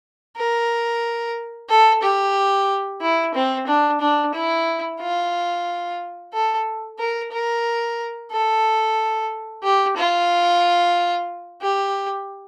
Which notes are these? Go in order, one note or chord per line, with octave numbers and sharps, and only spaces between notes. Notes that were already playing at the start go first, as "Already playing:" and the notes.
A#4
A4
G4
E4
C4
D4
D4
E4
F4
A4
A#4
A#4
A4
G4
F4
G4